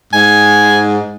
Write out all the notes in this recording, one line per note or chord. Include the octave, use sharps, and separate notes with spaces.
G#2 G#5